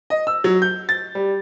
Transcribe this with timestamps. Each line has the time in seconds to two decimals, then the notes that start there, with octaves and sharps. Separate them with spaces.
0.10 D#5
0.27 E6
0.44 F#3
0.62 G6
0.89 A6
1.15 G3